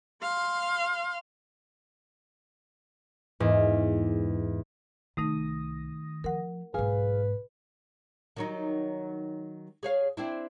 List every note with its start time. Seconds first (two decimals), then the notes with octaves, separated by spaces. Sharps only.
0.22 F5 C6
3.40 E2 G#2
5.17 C2 D#3 A3 D#4 D#6 A#6
6.24 F3 A#4 F#5
6.74 B1 G#2 G#4 B4 F5
8.36 D#3 F#3 D#4
9.83 G#4 C#5 F5
10.17 C4 D4 E4